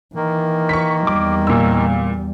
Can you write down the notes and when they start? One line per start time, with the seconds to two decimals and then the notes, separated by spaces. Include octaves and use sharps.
0.15 D#3 E3 A#3
0.69 C#6 B6
1.07 E2 G3 D6
1.47 A#2 E6